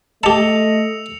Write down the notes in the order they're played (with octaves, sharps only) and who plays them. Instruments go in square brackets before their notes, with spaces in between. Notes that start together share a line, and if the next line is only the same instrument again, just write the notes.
[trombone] A3 [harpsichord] G4 A5 [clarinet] D#5 [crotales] E6 C#7 F7